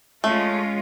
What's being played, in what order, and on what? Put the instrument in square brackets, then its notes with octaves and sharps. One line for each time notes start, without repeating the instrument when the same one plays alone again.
[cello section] G#3 C#4 F4 [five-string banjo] A3